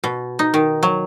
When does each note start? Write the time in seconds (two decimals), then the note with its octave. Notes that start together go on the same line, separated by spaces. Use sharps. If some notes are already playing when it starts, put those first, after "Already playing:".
0.04 B2
0.39 D#4
0.54 D#3
0.83 F#3